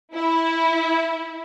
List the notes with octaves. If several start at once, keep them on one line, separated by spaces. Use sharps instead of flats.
E4